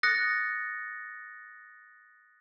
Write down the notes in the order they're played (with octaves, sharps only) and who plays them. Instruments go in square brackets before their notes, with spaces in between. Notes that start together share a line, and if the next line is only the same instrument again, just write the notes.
[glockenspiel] D#6 F#6 A6 A#6 C#7